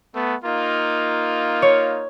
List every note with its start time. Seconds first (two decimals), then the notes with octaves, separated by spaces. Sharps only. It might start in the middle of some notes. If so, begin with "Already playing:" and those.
0.15 A3 B3
0.44 A#3 D#4 F4
1.62 C#5